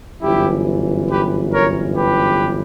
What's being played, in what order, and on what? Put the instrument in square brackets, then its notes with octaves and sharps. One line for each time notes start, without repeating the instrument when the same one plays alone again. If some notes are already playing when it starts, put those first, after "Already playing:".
[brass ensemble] G1 F#2 E3 E4 G4
G4 B4
A#4 C#5
G4 B4